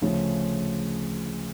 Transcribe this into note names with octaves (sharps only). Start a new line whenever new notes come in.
D2 C#3 F3 A3 C#4